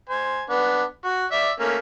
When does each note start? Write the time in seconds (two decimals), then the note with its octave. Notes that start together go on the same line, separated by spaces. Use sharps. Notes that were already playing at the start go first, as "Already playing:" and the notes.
0.09 C5 G#5
0.50 B3 D4
1.05 F#4
1.32 D5 E5
1.60 A3 A#3 C#4